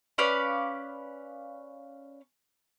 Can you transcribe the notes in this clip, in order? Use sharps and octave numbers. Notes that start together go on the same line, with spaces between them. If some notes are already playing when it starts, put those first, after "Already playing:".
C#4 B4 D5 F5